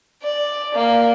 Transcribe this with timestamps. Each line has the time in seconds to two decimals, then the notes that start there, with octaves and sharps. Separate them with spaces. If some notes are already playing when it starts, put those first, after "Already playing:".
0.22 D5
0.74 A#3